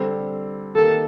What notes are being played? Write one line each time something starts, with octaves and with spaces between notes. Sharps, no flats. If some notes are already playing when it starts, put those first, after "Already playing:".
Already playing: D3 G3 C4
D#3 A#3 D#4 G4 A4 A#4